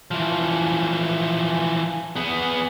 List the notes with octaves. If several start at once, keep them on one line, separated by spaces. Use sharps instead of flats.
E3 F3
B3 G#4